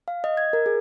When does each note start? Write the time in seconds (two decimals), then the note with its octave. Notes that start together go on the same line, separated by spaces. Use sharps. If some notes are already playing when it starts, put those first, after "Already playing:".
0.08 F5
0.24 D#5
0.37 G#6
0.53 A#4
0.66 G#4